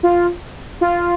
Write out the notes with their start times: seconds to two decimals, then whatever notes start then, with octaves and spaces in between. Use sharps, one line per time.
0.03 F4
0.81 F4